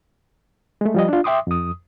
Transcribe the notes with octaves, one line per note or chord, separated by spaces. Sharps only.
G#3 A3
F3 G3 D#5
D4 F4
E5 G5 C6 D6 D#6
F2 D#6